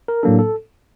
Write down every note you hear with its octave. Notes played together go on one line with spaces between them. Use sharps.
A#4
A2 F#3 A#3 D4 A4
A4